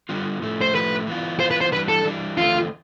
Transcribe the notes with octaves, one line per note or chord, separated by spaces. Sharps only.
D3 G3 B3 F4
A2 F3 A3
C5
A2 F3 A3 B4
E3 B3 F4
E3 B3 F4 C5
B4
C5
E3 G3 D4 B4
A4
E3 G3 D4
E2 D3 F3 A3 C4 F4